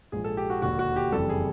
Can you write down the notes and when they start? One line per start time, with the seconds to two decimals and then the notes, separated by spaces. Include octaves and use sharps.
0.12 A#1 G#2 F3 G#4
0.24 A4
0.37 G4
0.50 F#4
0.62 E1 D#2 D3 F#4
0.79 F#4
0.96 G4
1.12 F#1 F2 C3 E3 G3 A4
1.29 G#4